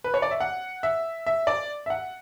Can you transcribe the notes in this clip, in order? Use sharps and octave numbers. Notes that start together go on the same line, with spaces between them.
B4
C#5
D5
E5
F#5
E5
E5
D5
E5
F#5